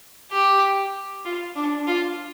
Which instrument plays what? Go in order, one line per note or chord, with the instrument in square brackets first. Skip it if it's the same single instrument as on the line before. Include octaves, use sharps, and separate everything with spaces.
[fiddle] G4
F4
D4
F4